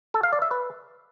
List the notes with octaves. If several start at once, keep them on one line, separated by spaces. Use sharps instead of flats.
A4
F5
D5
E5
B4